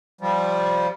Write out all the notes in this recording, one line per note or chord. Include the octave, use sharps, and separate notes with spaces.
F3 G3